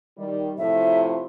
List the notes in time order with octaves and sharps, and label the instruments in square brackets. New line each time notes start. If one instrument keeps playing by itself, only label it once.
[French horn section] D#3 G3
[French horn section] A2 C3 F3 [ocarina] E5